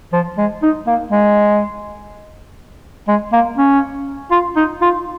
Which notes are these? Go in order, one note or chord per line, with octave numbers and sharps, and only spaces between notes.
F3
G#3
D#4
A#3
G#3
G#3
A#3
C#4
F4
D#4
F4